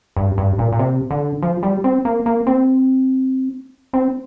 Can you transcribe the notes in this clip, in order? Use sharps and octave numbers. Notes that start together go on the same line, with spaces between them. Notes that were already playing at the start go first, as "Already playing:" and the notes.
G2
G2
A#2
A#2
C3
D3
F3
G3
C4
A#3
A#3
C4
C4